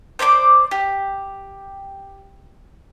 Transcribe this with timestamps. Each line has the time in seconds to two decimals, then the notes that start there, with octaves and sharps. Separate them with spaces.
0.19 C5 D5 B5 D6
0.71 G4